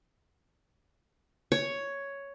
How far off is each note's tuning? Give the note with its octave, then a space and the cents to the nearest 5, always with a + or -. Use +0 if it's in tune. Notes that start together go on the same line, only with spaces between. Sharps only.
C#5 +5